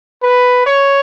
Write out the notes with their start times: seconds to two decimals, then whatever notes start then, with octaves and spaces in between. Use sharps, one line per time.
0.23 B4
0.66 C#5